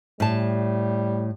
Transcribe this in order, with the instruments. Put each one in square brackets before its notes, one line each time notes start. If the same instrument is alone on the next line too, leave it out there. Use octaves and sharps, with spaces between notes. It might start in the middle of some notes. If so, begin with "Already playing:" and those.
[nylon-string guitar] A2 A5 [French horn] G3